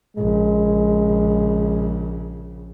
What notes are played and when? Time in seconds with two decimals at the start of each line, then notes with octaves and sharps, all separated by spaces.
0.17 A#1 C#3 G#3